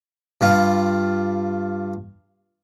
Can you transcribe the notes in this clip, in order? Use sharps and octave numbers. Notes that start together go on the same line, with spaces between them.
G2 G3 F4